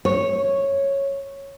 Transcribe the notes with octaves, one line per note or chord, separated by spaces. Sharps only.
C#5